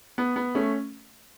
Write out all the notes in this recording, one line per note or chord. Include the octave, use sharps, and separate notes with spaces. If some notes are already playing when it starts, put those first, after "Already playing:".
B3
B3
A3 C#4